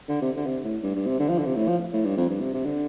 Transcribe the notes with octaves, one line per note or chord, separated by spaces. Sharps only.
D3
C3
D3
C3
A2
G2
G2
C3
D3
F3
D3
C3
A2
F3
A2
G2
F2
G2
C3
C3
D3